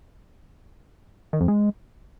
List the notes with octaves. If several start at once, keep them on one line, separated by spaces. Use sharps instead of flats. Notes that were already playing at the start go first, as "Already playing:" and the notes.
D#3
F2
G#3